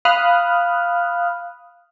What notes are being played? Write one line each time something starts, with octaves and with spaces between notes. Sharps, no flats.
F5 B5 D#6 F6 F#6